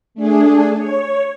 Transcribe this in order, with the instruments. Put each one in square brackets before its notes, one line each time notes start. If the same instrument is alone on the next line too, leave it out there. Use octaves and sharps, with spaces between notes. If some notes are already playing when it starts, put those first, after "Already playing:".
[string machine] A3 D4 G#4
C#5